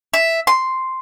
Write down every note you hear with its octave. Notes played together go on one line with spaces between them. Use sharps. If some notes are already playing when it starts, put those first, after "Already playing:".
E5
C6